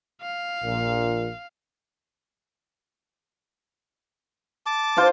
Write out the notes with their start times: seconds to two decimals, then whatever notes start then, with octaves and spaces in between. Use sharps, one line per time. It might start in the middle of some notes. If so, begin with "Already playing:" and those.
0.22 F5
0.63 A#1 A#2
4.66 A5 D6
4.97 D4 F4 C5